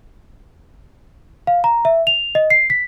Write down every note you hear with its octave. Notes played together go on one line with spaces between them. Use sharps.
F5
A#5
E5
F7
D#5
C7
B6